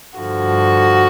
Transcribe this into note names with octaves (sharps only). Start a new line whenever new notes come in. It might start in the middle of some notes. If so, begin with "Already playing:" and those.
G2 D3 F3 F#4